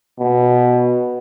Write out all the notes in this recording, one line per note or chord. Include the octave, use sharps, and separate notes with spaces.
B2